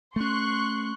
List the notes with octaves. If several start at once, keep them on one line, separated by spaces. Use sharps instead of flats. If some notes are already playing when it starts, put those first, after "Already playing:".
A3 C#4 C6 C#6 F#6